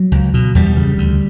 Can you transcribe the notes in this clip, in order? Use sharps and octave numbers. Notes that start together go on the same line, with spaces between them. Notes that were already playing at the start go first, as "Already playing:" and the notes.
Already playing: F#3
C#2
B2
E2 G3
C#3
D2